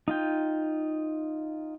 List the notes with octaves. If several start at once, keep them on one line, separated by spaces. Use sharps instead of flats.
D#4 F4 G5